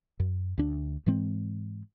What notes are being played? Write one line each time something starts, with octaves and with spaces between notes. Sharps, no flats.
F#2
D2 D4
G#2 E3 G#3 C4